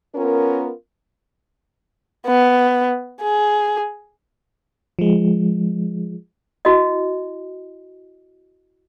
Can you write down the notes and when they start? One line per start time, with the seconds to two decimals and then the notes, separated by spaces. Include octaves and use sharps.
0.15 B3 C#4 F4 A#4
2.27 B3
3.22 G#4
4.99 F3 G#3
6.65 E4 F#4 D#5